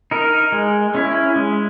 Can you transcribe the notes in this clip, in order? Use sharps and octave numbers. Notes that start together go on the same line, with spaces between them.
D#4 A#4
G#3
C#4 E4
G#3